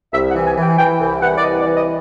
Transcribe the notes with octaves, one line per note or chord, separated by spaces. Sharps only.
C2 E5
F#5
E3
G#5
E3
G5
E3 G5
C2
E3 F#5
D5
C2 D#5
D5
E3
D#5